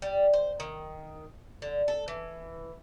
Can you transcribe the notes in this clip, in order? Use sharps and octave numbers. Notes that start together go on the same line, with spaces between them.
G3
C5
D#3
D3
A4
E3